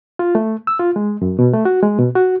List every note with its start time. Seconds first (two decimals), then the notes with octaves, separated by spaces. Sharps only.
0.19 F4
0.35 A3
0.67 E6
0.80 F4
0.96 G#3
1.22 F#2
1.39 B2
1.54 A3
1.65 F#4
1.83 G#3
1.98 B2
2.15 F#4